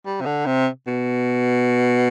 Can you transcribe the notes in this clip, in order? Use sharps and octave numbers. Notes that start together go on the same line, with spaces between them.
G3
C3
D3
C3
B2